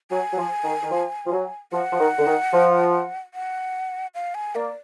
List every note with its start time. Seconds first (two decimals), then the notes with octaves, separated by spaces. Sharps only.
0.11 F#3 G#5
0.32 F#3
0.38 F3
0.64 D#3
0.82 D#3
0.91 F3
1.26 F3
1.32 F#3
1.73 F3 F#5
1.92 F3
1.99 D#3
2.19 D3
2.26 D#3
2.53 F3
3.34 F#5
4.15 F5
4.35 G#5
4.55 A#3 D5